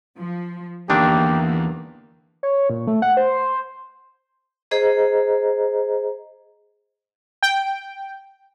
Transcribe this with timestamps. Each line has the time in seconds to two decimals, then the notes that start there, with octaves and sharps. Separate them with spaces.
0.17 F3
0.90 E2 D3 D#3 A#3 D4 G4
2.43 C#5
2.70 A#2
2.87 A3
3.02 F#5
3.17 C5
4.71 G#4 C5 D#5 A#5
7.43 G5